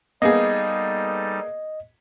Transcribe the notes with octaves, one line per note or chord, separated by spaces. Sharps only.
G3 A#3 B3 D#4 G#4 A4 D#5